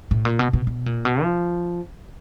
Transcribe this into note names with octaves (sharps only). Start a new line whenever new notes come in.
A2
A#2
B2
B2
B2
A#2
B2
F3